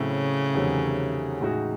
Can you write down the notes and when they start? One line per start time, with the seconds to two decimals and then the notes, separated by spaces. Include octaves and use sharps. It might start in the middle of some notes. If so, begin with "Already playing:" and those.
Already playing: A2 C#3 F#3 C4 E4 A4
0.54 E2 C3 D#3 F#3 A3
1.41 A2 E3 G#3 D#4 F#4